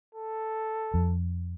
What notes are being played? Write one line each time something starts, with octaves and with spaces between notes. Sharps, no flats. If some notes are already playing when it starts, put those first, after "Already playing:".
A4
F2